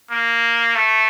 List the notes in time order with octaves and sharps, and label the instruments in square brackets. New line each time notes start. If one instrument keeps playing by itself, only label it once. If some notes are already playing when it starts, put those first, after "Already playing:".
[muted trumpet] A#3
A3